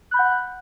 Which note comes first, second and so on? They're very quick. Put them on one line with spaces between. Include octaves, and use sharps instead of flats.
F#6 B5 G6 F#5